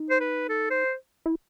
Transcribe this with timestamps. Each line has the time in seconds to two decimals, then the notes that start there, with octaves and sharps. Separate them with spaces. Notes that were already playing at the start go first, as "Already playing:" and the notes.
Already playing: D#4
0.10 C5
0.21 B4
0.49 A4
0.71 C5
1.26 E4